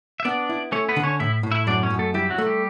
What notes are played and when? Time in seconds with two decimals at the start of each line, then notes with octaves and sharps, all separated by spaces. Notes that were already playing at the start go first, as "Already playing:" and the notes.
0.20 E5
0.25 B3 D4 D5
0.49 E4
0.72 A3 C#4 C#5
0.89 B3 B4
0.96 D3
1.04 C#4 C#5
1.20 A2 E4 E5
1.43 A2
1.52 E4 E5
1.67 F#2 D4 D5
1.83 C#4 C#5
1.90 F#2
1.99 A3 A4
2.14 G3 E4 G4
2.30 F#3 F#4
2.38 A3
2.46 G3 G4